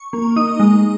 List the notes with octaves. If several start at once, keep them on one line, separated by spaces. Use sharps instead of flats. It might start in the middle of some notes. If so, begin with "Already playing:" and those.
Already playing: C#6
A#3
D#4 D#6
G#3